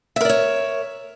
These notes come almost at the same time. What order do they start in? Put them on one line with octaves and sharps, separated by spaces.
E5 A#4 D5 C#5